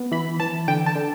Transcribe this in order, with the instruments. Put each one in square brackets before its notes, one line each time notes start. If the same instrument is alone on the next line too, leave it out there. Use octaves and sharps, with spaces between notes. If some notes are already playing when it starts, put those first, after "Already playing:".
Already playing: [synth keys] B3
E3 B5
E3 A5
D3 G5
A5
D3